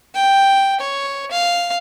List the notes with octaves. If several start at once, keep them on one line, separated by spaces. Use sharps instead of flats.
G5
C#5
F5